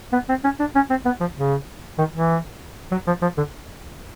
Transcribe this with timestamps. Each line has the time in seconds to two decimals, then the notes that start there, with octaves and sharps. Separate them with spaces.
0.13 B3
0.29 C4
0.44 C#4
0.60 D4
0.75 C#4
0.90 C4
1.05 B3
1.21 F3
1.37 C#3
1.98 D#3
2.14 E3
2.91 F#3
3.07 F3
3.22 F3
3.37 D3